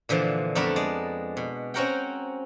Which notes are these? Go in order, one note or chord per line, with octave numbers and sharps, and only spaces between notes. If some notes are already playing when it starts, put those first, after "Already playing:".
A#2 D3 E3 F3
F2 A3 B3 D4 A#4 B5
G#3 D5
B2
C4 C#4 F#4 A#4 F#5 G5